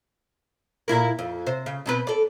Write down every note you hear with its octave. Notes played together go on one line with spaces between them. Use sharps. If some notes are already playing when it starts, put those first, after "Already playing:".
A#2 E4 A#4
F2
C3 C5
C#3
B2 C4 B4
A4 D5